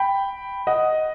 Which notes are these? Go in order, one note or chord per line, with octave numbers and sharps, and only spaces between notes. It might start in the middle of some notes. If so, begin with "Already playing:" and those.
Already playing: G5 B5
D#5 F#5